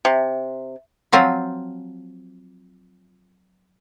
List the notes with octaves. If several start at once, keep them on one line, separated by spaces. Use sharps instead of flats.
C3
F3 F#3 C4 F4